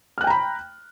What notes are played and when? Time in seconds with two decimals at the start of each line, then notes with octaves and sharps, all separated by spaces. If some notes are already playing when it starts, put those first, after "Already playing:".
0.18 F6
0.21 F#6
0.24 G5
0.27 A#5
0.30 B5